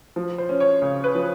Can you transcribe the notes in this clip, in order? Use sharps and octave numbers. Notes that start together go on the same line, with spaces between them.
F3
C5
C#4
C#5
C#3
B4
F3